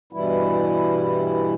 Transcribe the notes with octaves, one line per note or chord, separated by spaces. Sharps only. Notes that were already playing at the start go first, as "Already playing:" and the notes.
G2 B2 E3 G3 E4